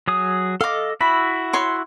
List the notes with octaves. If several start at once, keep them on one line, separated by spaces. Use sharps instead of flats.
F#3 G#4 D#6
A4 D#5 F5 D6
E4 F#4 E5 B5
C#5 C6